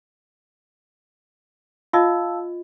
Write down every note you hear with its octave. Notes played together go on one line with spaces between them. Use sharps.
F4 D#5 F5 A5 E6